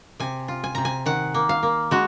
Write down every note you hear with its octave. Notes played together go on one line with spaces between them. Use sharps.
C3 G#5
F4
G#5
C3 A#5
G#5
D#3 F#5
A#3
F5
A#3
G#3 F#4